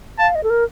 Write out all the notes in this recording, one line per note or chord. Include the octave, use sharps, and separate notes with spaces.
F5 A5
D#5
A4
A#4